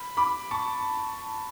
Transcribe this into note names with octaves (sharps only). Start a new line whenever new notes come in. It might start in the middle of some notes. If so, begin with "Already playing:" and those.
Already playing: B5
B5 D6
A5 C#6